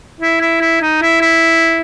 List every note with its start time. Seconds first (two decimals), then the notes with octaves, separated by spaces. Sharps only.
0.20 E4
0.41 E4
0.61 E4
0.81 D#4
1.01 E4
1.21 E4